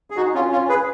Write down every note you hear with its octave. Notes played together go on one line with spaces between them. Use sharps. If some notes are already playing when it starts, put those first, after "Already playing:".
G#4
D#4 F#4
C#4 F4
C#4 F4
G#4 B4